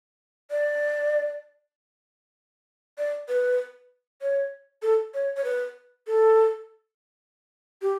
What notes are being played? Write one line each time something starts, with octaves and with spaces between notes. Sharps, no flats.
D5
D5
B4
C#5
A4
C#5
C#5
B4
A4
G4